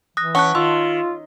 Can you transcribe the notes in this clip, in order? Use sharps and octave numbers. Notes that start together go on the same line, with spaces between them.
E3 D#6 F#6 A#6
C#4 F#5 A5 C#6 F#6
D#3 F4 C6 E6